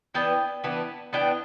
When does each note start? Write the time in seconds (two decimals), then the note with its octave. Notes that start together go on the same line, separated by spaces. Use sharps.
0.15 E3 B3 D4 G5
0.64 E3 B3 D4
1.13 E3 B3 D4 G5